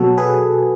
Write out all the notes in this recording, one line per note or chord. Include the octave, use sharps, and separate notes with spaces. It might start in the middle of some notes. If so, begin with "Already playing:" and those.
Already playing: B2 F#3 F#4 A4
G#4 B4